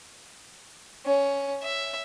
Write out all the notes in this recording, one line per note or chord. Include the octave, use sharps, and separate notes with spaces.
C#4
E5